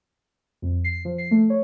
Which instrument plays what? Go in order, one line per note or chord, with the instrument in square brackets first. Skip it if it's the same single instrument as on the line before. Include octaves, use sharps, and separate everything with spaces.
[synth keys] F2
C7
F3
C7
A3
C#5